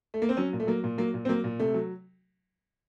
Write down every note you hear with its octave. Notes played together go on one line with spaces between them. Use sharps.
A3
A#3
C4
F#3 C#4
A#2
A3
F#3 A#3
A#2
F#3 A#3
A#2
C4
F#3 A#3
A#2
C3 A3
F#3